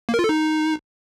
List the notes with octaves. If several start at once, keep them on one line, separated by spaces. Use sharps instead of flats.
A#3
A#4
F4
A4
D#4